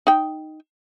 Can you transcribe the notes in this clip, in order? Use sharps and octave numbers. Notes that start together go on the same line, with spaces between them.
D#4 G5